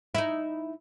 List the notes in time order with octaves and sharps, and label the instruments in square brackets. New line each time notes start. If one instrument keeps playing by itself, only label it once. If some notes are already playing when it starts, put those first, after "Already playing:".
[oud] D#4 E4